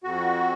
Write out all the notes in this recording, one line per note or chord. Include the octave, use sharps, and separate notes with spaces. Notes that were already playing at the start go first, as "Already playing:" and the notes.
F2 F#4